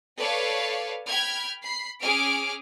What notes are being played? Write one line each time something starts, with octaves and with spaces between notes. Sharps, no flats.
A4 B4 C#5 D5 F5 A5
G5 B5 F6 G#6
B5 C7
C#4 G#4 G#5 D6 F6 D7